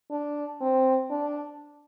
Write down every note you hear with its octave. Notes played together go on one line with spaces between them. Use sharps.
D4
C4
D4